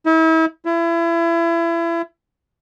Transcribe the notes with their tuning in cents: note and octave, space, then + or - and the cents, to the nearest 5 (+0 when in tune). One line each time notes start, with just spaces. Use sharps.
E4 -40
E4 +30